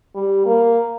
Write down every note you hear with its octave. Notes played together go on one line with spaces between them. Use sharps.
G3
A#3